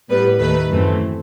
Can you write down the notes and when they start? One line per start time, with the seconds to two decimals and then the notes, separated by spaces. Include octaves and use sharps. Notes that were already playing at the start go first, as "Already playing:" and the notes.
0.10 A2 G3 B3 B4
0.40 D#2 D#3 A3 B4
0.70 F#2 E3 A3 C4